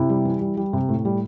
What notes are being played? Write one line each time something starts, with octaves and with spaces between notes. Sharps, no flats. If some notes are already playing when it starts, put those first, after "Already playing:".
Already playing: C3 E4
G3
E3
G3
G3
C3
A2
G3